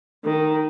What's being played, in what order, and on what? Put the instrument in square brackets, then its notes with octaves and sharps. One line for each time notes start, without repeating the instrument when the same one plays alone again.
[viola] D#3